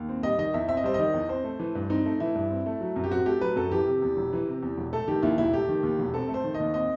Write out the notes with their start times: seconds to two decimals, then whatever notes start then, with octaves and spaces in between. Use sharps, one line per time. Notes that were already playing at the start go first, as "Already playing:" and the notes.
Already playing: D#2
0.09 C4
0.23 G3 D#5
0.39 D#3 D#5
0.54 E2 E5
0.69 C4 E5
0.77 D#5
0.84 G3 C5
0.94 D#3 D#5
1.14 E2
1.29 C4 C5
1.44 A3
1.59 E3
1.75 G2
1.90 C4 D#4
2.06 A3
2.20 E3 E4
2.35 G2
2.50 C4
2.66 A3
2.81 F#3
2.96 F#2
3.04 G4
3.11 C4 F#4
3.26 A3 G4
3.41 F#3 B4
3.56 F#2 A4
3.72 E3 G4
3.87 C3
4.02 E2
4.17 E1
4.33 E3
4.47 C3
4.63 E2
4.78 E1
4.93 A3 A4
5.08 D#3 G4
5.23 D#2 E4
5.38 E1 E4
5.53 A3 G4
5.69 D#3
5.83 D#2
5.99 E1
6.14 C4 A4
6.29 A3
6.34 C5
6.44 D#3
6.55 D#5
6.60 D#2
6.74 C4 D#5